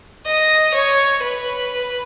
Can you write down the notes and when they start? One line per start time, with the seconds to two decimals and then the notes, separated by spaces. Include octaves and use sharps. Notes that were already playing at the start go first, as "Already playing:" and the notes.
0.25 D#5
0.73 C#5
1.22 B4